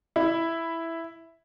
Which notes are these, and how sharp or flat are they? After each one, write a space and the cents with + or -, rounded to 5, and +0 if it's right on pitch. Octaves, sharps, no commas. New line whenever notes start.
E4 +0